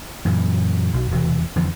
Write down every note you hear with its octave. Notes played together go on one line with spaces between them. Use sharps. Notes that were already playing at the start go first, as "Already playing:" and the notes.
F#2 A#2 E3
B1
E1 C3 E3
F2 D3 E3 F3